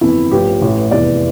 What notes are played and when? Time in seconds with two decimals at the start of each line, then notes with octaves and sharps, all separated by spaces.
0.01 G1 F2 E3 E4
0.31 A1 G2 F3 G4
0.62 A1 A2 E3
0.91 F1 E2 E3 D5